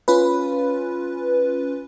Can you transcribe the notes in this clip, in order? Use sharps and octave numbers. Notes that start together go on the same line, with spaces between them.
C#4 F4 B4